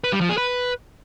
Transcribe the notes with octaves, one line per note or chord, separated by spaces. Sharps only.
B4
G3
F3
G#4
B4